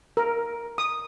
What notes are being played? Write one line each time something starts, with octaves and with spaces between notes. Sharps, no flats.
A#4
D#6